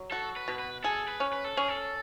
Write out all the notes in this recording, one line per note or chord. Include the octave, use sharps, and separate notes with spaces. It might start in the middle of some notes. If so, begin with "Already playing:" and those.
Already playing: F#3
F#4 A4
B4
B2
B4
G#4 A4
B4
C#4
B4
A4
C#4 G#4
A4